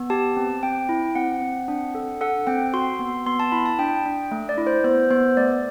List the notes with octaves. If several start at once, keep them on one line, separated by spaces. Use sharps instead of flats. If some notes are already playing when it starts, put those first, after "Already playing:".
Already playing: B3
G4 A5
C4
C4 G5
E4
C4 F#5
C4
D4
A4
A4 F#5
C4 G5
F#4 C6
B3
B3 C6
A5
E4 B5
A5
D4 G5
D4
A3
D5
E4
C5
B3 C5
B3 C5
A3 D5